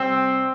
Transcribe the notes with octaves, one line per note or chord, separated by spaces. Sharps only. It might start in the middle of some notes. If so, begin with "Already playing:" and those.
Already playing: C3 G3 C4